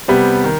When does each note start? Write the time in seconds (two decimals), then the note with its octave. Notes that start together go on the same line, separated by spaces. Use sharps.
0.08 C3 G3 B3
0.44 D#3